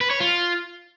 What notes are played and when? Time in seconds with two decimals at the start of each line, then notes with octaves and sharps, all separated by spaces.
0.01 B4
0.10 C#5
0.20 F4